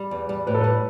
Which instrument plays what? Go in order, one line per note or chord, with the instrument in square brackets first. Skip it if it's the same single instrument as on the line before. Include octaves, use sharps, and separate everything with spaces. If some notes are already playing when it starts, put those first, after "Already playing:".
Already playing: [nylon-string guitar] G3
E2
G3
[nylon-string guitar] A2 [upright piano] B4
[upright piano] A4
[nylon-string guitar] G3 [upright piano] B4